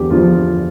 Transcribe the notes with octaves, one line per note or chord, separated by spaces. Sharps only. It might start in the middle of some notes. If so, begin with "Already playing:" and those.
Already playing: E2 D3 F3 G4
E2 D3 F3 F4